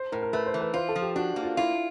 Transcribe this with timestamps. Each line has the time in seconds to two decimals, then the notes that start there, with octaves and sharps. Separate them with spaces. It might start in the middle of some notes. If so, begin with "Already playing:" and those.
Already playing: C5
0.12 A2 A#4
0.23 A#4
0.33 A3 B4
0.46 C5
0.54 E3
0.61 B4
0.74 F4 C5
0.89 A4
0.96 F3
1.02 G4
1.16 D4 F#4
1.36 A#3
1.43 F4
1.57 E4 F4